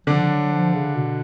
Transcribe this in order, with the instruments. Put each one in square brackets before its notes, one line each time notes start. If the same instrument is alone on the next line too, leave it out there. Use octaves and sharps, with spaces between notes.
[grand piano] D3 D4 [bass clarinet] F3
[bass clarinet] F#3
F3
C#3
B2